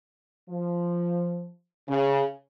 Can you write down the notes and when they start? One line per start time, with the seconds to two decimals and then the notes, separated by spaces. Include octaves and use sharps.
0.50 F3
1.89 C#3